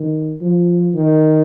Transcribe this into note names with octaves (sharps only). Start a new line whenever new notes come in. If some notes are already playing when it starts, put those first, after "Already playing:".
Already playing: D#3
F3
D#3